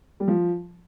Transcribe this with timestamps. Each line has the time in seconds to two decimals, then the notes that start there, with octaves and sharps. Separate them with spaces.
0.20 G3
0.28 F3